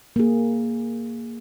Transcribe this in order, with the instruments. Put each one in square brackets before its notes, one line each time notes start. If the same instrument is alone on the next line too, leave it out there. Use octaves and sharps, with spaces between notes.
[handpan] A#3 G#4